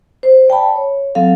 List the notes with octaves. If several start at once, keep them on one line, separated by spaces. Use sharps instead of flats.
C5
D5 G5 A5 B5
C#5
F#3 C4 A4 F5